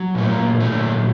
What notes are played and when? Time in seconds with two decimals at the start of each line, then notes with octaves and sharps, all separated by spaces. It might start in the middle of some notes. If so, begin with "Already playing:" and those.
Already playing: F#3
0.15 A#2 A3
0.30 A#3
0.60 F#3 A3